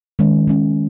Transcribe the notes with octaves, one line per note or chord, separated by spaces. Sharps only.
D#3 G#3 C#4
D#3 G#3 C#4